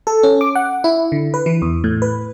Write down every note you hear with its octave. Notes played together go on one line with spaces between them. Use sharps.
A4
C#4
D6
F#5
E4
D3
B4
E3
E2
A2
B4